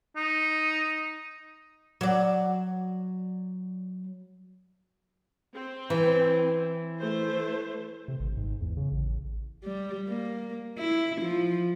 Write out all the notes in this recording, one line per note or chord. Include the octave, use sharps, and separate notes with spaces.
D#4
F#3 D5
C4
E3
A3 C5
C3
G#1
G#2
E2
C#3
A1
G3
A#3
E4
F3